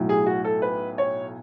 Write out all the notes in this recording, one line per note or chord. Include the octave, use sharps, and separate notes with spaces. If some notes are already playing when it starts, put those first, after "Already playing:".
Already playing: B1 A2 F#3
G#4
F#4
A4
B4
C#5